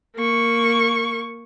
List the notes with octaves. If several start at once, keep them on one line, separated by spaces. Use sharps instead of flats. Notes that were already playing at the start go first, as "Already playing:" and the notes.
A#3 C#6